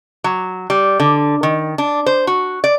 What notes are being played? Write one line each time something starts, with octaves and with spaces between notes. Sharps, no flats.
F#3
G3
D3
D#3
D4
C5
F#4
D5